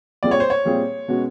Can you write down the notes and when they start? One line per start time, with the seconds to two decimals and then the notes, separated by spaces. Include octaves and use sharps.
0.23 A#2 G3 C4 F4 G#4 D5
0.31 C#5
0.40 C5
0.50 C#5
0.65 A#2 G3 C4 F4 G#4
1.08 B2 G#3 C#4 F#4